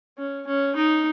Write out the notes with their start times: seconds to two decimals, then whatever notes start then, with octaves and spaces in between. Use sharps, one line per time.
0.18 C#4
0.47 C#4
0.76 D#4